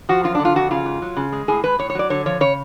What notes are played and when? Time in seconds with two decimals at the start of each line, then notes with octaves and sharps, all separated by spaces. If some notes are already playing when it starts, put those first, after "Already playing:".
0.09 F3 F#4
0.24 F#2 F4
0.35 D4
0.40 D3
0.45 F4
0.55 F2 F#4
0.71 C#3 F4
0.86 G#2
1.02 F#3
1.17 C#3
1.32 G#3
1.48 A2 G#4
1.64 G#3 B4
1.79 A2 C#5
1.90 C#5
1.95 F#3 D5
2.10 D3 C#5
2.26 F3 C#5
2.41 C#3 C#5